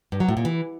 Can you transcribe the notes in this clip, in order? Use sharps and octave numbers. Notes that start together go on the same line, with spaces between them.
G2
F#3
A2
A#2
E3